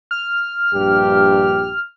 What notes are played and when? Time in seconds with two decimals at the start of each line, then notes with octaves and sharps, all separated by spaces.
0.11 F6
0.74 A#1 G2 G4